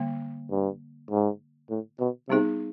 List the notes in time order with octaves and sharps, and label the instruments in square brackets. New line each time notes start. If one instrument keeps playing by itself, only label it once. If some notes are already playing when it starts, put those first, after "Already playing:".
Already playing: [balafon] D3 G3 A#3
[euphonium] G2
G#2
A2
B2
[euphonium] C3 [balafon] G3 B3 D#4 G#4